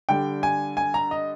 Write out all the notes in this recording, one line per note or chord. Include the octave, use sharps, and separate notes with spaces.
D3 G3 G5
G#5
G#5
A#5
D#5